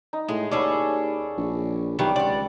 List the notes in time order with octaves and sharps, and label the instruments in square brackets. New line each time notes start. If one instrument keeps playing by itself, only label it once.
[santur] D#4
[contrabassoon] A2 [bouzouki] G#3
[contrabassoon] D#2 [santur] B3 C#5 D5 [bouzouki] C#4 G#4 A4
[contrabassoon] A#1
[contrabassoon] B1 [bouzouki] D#3 E3 [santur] G3
[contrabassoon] C#2 [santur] C4 [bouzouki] D5 F#5